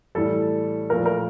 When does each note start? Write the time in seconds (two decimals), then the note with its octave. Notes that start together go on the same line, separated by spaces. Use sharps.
0.15 A2 E3 G3 A4
0.90 A#2 F3 A3 A#4
1.06 A#4